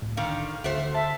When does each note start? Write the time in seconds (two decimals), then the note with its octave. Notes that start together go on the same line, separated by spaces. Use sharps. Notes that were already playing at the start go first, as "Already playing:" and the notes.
0.02 C2 A2
0.17 D3 D#3 D4 F5
0.64 D2 D3 A3 F#4 C5
0.95 E5 A5